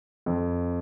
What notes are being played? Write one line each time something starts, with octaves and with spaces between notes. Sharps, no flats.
F2